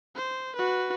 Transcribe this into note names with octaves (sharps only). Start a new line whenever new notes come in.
C5
F#4 B4